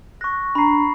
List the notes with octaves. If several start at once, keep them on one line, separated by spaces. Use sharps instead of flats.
C#6 F#6 A#6
D4 A#5 B5 C7